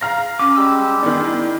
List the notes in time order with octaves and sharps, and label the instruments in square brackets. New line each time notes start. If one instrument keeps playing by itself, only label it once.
[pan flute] F5 [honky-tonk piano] A#5 F6 A#6
[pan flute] C#4 [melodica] F#4 [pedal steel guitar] D6
[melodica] G3 G#3 G4 [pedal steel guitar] E6
[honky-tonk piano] D#3 E3 D4 [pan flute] B3
[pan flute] E4